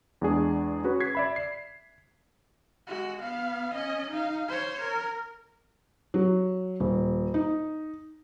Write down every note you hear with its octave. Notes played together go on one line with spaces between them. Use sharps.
E2 G#3 D4 G#4
C#4 F#4 G#4 B4
G#6 B6 C7
D5 E5 B5
C7
G#3 F#4
B3 F5
C#4 D#5
D#4 F5
C5 C#5
A#4
F#3
D#1
D#4